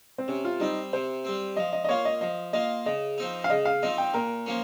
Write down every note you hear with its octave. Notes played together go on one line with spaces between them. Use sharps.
C4
C3 C#4
F4
G3 C4 D#4
C3 C5
G3 C4
F3 D#5
D#5
D#5
A#3 F4 C#5
D#5
F3 D#5
A#3 F4 D#5
C#3 D#5
F3 C4 D#4
F5
C#3 D#5
F5
F3 C4 D#4 D#5
G5
A#2 A#4
F3 A#3 C#4